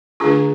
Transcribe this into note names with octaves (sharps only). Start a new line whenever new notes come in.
D3 A3 D4 F4 G#4